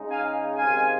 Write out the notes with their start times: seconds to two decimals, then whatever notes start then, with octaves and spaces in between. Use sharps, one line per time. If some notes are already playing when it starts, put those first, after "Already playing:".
Already playing: C#3 G#3 D#4
0.10 F5 G#5
0.55 C3 D#3 G#3 F5 G#5